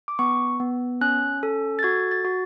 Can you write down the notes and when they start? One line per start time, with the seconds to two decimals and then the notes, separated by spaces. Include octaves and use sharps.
0.08 D6
0.19 B3 C#6
0.60 B3
1.01 C#4 F#6
1.43 A4
1.79 A6
1.83 F#4 G#6
2.11 A6
2.25 F#4